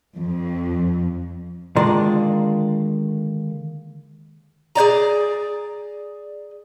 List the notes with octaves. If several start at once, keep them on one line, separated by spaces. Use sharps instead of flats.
F2
D3 D#3 G#3 A#3 F4 D5
G#4 C5 D5 A#5